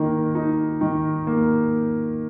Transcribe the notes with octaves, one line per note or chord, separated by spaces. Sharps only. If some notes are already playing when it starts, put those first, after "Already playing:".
Already playing: D#3 A#3
D#4
D#3
A#3